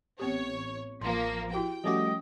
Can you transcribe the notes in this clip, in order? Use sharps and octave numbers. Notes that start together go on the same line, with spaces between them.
A1 B3 C4 G4 C#5
A1 F3 A#3 C6
E4 F#4 G4 G5
F3 G3 A3 C#4 F#4 D#5 D6